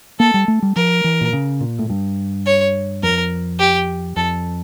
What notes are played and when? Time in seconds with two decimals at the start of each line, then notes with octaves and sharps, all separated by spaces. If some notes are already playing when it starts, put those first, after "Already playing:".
0.19 A#3 A4
0.34 G3
0.48 A3
0.62 G3
0.76 F3 A#4
1.04 E3
1.21 A#2
1.33 C#3
1.61 A#2
1.79 A2
1.90 G2
2.46 C#5
3.03 F2 A#4
3.59 G4
4.16 F2 A4